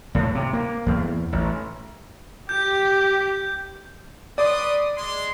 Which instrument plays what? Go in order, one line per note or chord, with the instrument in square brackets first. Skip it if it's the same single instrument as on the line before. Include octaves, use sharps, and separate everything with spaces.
[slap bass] A2
C3
A#3
E2
A1
[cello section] G4 [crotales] G6
[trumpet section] B4 C6 D#6 [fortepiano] D5
[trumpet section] G#3 C6